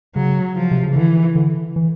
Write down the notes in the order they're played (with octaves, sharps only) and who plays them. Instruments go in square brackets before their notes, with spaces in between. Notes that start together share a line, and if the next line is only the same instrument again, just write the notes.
[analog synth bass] C#3 [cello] F#3
[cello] F3
[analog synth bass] C3
C#3
[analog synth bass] D3 [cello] E3
[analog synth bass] D3
E3